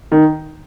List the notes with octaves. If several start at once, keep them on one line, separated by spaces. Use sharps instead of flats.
D#3